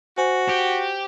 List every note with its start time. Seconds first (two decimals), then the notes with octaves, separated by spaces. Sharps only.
0.18 F#4 C5 G#5
0.50 G4